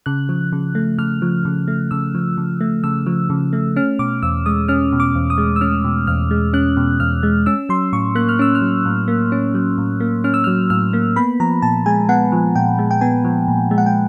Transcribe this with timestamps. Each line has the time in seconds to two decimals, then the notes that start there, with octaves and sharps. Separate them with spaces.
0.06 C#3 F#6
0.29 F3
0.52 C#3
0.75 A3
0.98 C#3 F6
1.22 F3
1.45 C#3
1.68 A3
1.91 C#3 E6
2.15 F3
2.37 C#3
2.61 A3
2.84 C#3 E6
3.06 F3
3.30 C#3
3.53 A3
3.76 C#4 F6
3.99 B2 D6
4.23 E2 E6
4.46 G#3 D#6
4.68 C#4 F6
4.92 B2
5.00 D6
5.15 E2
5.30 D#6
5.38 G#3
5.56 E6
5.61 C#4 F6
5.84 B2
6.07 E2 F6
6.31 G#3
6.53 C#4 F#6
6.77 B2
7.00 E2 F6
7.23 G#3
7.46 C#4 E6
7.69 F#3 C6
7.93 A2 C#6
8.15 A#3 F#6
8.29 F6
8.39 C#4 E6
8.55 F6
8.62 F#3
8.85 A2
9.08 A#3
9.32 C#4
9.55 F#3
9.78 A2
10.00 A#3
10.24 C#4 F6
10.34 E6
10.44 F#3 F6
10.70 A2 F6
10.93 A#3
11.16 B3 B5
11.40 F3 A#5
11.62 A#2 A5
11.86 G#3 G#5
12.09 B3 F#5
12.32 F3
12.56 A#2 G5
12.79 G#3
12.91 G5
13.01 B3 G#5
13.24 F3
13.48 A#2
13.71 G#3
13.78 F#5
13.86 G5